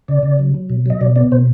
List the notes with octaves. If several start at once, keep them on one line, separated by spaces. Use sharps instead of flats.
C#3 D5
C#3
F#3
F#3
B2
F#3 D#5
B2 D5
B3 D5
B2 C5